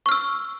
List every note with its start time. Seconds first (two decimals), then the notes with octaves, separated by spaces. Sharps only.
0.06 C#6
0.09 F6
0.12 E6